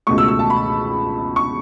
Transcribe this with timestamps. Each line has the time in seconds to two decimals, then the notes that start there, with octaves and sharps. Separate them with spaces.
0.07 C#2 B2 A3 C#6
0.18 E6
0.28 E6
0.39 A5
0.50 B5
1.36 C#6